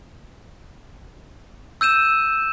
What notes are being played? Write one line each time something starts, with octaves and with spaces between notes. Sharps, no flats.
E6 G6 D#7 E7